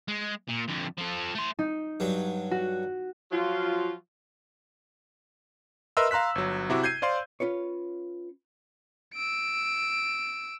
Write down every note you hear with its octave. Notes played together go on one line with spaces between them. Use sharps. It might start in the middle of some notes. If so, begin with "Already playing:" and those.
G#3
A#2
F2 D3
F3 A4
A3 C6
D#4
G2 F#3
F#4
F3 F#3 F4
A#4 B4 D#5 E5 C6 E6
F5 A#5 C6 F#6 B6
G1 F#3
C3 E4 F#4 D6
G6 G#6 C7 D#7
C5 D5 F5 C6
C#4 F4 B4 C#5
E6 D7